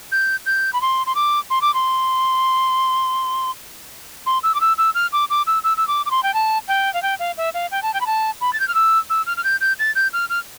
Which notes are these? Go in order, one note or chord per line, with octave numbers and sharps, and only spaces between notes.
G6
G6
B5
C6
C6
D6
C6
D6
C6
C6
E6
D6
E6
E6
F6
D6
D6
E6
E6
E6
D6
D6
C6
G5
A5
G5
F5
G5
F5
E5
F5
G5
A5
G5
B5
A5
B5
A6
G6
F6
E6
E6
F6
F6
G6
G6
A6
G6
F6
F6